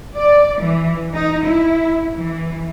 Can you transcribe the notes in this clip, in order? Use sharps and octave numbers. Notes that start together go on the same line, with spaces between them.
D5
E3
D#4
E4
E3